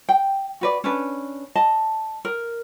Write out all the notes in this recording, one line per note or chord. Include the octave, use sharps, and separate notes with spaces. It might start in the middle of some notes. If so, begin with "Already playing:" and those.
G5
F#4 B4 D5
C#4 D4 B4
D#5 A5
A#4